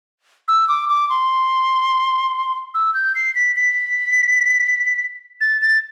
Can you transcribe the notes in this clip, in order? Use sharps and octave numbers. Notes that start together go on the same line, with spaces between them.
E6
D6
D6
C6
E6
G6
C7
B6
B6
A6
A6